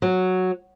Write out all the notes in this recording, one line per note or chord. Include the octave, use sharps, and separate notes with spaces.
F#3